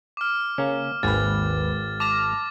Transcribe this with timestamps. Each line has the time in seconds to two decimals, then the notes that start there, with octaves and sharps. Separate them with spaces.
0.17 D6 F6
0.58 C#3 A#3 C#4
1.03 G#1 D#2 B4 G#5 A6
2.00 A5 D6 F6 A#6